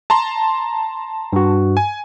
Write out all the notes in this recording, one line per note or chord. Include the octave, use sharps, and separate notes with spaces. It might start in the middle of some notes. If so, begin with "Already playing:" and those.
A5 A#5 C6
G2 F#4
G#5